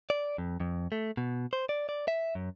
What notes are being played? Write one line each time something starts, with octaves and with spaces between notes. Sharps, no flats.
D5
F2
F2
A3
B2
C5
D5
D5
E5
F#2